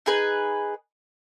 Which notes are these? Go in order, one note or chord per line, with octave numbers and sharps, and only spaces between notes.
D#4 G#4 B4